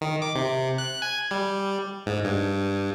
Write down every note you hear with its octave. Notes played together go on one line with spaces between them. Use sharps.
D#3
D6
C3
F#6
G#5
G3
G#2
G2